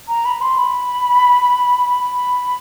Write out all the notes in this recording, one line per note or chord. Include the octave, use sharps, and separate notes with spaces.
A#5
B5
C6
B5
B5